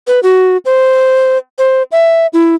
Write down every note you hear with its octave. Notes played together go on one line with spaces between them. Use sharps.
B4
F#4
C5
C5
E5
E4